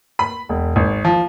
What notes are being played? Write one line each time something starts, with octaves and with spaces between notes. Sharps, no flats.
B5
E1
G#1
F3